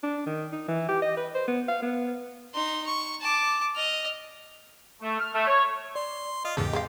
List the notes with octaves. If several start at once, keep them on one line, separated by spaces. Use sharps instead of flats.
D4
D#3
D#4
E3
G4
D#5
B4
C5
B3
F5
B3
D#4 C6
C#6
A5 D6
D#5 F6
A3
F6
A3
C#5
D5 C6
F4 D#5 D#6
E2 G#2 C#3 G4 A4
G#3 C4 F5